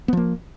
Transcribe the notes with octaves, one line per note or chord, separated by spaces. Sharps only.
F3 A#3 B3